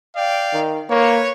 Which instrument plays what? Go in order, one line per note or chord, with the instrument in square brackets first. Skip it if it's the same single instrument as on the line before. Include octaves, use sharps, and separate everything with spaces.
[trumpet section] D5 F5 G5
[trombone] D#3
[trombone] A#3 [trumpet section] B4 C#5